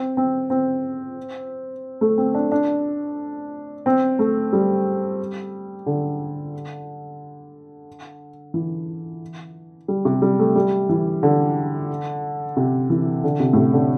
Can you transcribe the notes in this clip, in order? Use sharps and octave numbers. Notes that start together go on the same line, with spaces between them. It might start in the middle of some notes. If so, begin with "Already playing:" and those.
Already playing: C4
C4
C4
A3
C4
D4
D4
C4
A3
G3
D3
E3
G3
C3
G3
A3
G3
E3
D3
C3
E3
D3
C3
A2
C3
D3